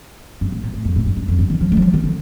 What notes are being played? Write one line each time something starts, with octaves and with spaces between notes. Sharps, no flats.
G2
A2
A#2
A2
F2
A2
G2
G2
F2
G2
D#3
F3
A3
F3
G3
D#3
D3